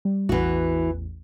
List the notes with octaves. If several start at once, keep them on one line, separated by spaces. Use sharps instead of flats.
G3
A1 E2 E3 F#4